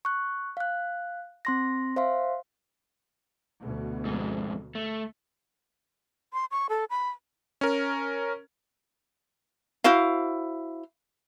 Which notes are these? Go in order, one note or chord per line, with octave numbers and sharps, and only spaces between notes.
C#6 F#6
F5 F#6
C4 C6 A#6
C5 E5 F5 C6
D2 B2
F2 G#2
A3
C6
C#6
A4
B5
C#4 A#4
E4 F#4 C5 F5